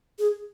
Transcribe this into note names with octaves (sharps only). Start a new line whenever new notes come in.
G#4